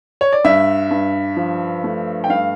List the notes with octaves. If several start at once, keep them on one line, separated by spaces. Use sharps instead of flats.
C#5
D5
G2 E5
G2
F3
A3
G5
G2 F5